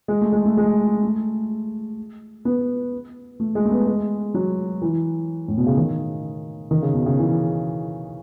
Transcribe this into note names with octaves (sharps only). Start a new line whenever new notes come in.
G#3
A3
G#3
A3
G#3
A3
B3
A3
G#3
A3
B3
G#3
F#3
E3
A2
B2
C#3
D#3
D#3
C#3
B2
C#3
E3